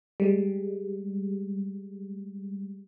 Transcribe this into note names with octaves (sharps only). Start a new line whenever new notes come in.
G3 G#3